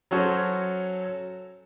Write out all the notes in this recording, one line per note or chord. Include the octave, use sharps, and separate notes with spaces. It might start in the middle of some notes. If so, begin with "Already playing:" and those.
F#3 C#4 F#4 A4 C5 C#5